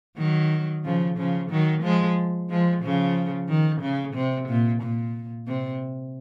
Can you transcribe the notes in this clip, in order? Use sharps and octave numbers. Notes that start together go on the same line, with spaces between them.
D#3 F#3
C#3 F3
C#3 F3
D#3 F#3
F3 G#3
F3 G#3
C#3 F3
D#3
C#3
C3
A#2
A#2
C3